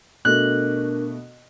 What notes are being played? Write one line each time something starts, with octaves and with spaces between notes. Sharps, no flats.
B2 A3 D4 A#4 F#6